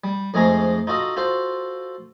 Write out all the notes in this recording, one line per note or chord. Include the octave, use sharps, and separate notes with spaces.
G3
F2 G#2 G#3 A3 G#4 A#5
D#4 F4 F#4 A4 D#5
F4 F#4 A4 C5